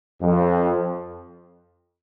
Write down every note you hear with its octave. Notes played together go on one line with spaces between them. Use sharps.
F2